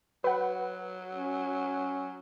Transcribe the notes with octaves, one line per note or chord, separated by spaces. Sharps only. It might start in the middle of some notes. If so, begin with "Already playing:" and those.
F#3 B4 F#5
C#4